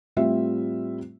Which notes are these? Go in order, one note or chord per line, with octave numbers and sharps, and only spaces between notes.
A2 G3 C4 F4 E5